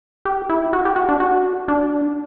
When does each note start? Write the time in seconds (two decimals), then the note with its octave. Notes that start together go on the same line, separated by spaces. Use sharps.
0.25 G4
0.50 E4
0.73 F#4
0.85 G4
0.96 F#4
1.09 D4
1.20 F#4
1.68 D4